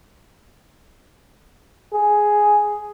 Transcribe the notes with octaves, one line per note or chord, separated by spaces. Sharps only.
G#4